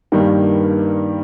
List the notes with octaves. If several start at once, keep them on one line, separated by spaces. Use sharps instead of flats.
G2 D#3 G3 A#3